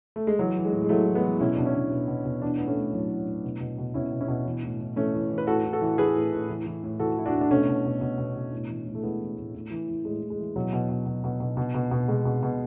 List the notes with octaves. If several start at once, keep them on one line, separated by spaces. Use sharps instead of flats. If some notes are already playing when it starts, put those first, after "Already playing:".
A3
G#3
E3 F#3
E3
G#3
A2
G#3
E3 F#3 A3
E3
G#3 B3
E3
B2 C#4 E4
B2 D4
C#4 E4
B2
B2
B2
B2
E3 B3 D4
A2 B3
A3 C#4
A2
A2 F#3
A2
A2
B2
B2
B2
B2 C#4 E4
B2
C#4 E4
B2
E3
A2
A2
E3 A3 C#4
E3
E3
B4
A2 F#4 A4
A2
F#4 A4
E3
E3 G#4 B4
A2
A2
E3
E3
A2
E3 F#4 A4
E3 E4
D4 F#4
A2
D4
B2 A3 C#4
B2
B2
B2
B2
B2
A2
E3
A2
A3
E3 G#3 B3
E3
A2
A2
E3
E3
A2 G#3
A2
G#3
E3
B2 F#3
B2
B2
B2
B2
B2
B2
B2
B2
B2 G#3
B2
B2